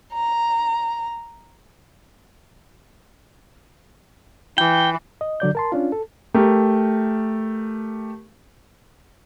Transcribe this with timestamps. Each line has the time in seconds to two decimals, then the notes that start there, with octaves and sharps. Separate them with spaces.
0.14 A#5
4.58 E3 G5
5.21 D#5
5.40 D3 F#3 D5 G6
5.55 A#4 A5 C6
5.72 C#4 D4 F4
5.92 A4
6.34 A3 G4 A#4